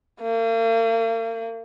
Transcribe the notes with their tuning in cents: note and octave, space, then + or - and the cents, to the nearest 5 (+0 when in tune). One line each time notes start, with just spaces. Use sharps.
A#3 -40